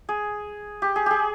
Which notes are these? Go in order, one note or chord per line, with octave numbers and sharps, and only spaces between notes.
G#4
G4
G#4
G4 G#4